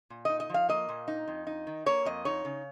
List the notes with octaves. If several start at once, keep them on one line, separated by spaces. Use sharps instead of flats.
A#2
D#4 D#5
D#5
F3 F5
A#3 D#5
A#2
D#4
F2
D#4
D#3
A#3 C#5
F2 D#5
D#4 C#5
C#3